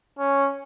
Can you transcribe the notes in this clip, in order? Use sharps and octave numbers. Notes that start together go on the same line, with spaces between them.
C#4